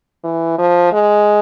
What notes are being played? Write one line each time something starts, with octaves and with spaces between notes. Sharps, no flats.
E3
F3
G#3